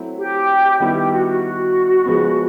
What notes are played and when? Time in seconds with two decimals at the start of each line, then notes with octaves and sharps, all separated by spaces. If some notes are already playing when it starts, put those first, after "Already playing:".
Already playing: F#3 A3 C4 E4
0.18 G4
0.80 D#3 G3 B3 E4 G4
0.96 G4
1.12 F#4
1.27 F#4
2.06 C#3 F3 G#3 B3